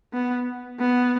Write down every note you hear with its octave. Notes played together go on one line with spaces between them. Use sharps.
B3
B3